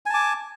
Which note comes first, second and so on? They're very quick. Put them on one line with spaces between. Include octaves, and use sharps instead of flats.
G#5 A5 D6